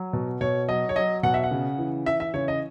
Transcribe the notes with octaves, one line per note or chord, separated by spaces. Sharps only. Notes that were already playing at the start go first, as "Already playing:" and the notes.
Already playing: F#3
B2
B2 C#5
F#3 D#5
C#5
F#3 D#5
B2 F#5
E5
F#5
C#3
E3
E3 E5
E5
C#3 C#5
D#5